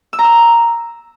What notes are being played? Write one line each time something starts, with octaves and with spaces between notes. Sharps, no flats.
E6
A#5
E6